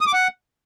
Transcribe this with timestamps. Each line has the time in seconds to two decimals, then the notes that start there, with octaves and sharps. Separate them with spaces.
0.01 D#6
0.07 D6
0.13 F#5